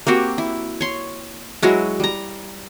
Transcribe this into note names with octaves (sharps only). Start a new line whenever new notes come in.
A#3 C4 F#4 G4
E4
C#5 C6
F#3 G#3 E4 F#4
G3 A#5